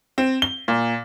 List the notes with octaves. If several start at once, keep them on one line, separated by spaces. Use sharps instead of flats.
C4
G7
A#2